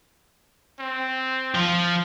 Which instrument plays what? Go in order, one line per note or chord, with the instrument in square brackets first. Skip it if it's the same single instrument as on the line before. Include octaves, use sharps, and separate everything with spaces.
[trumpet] C4
[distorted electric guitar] F3